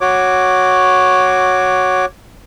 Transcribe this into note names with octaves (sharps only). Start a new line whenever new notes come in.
F#4 C#5 D6